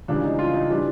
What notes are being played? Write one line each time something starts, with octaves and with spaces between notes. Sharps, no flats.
C#2 C#3 E3 G3 D4
D#4
F4
D#4
E3 G3 D4